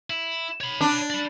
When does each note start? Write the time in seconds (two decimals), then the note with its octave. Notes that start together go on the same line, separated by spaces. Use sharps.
0.10 E4
0.61 C#5 B5
0.81 D4
1.10 D5 B5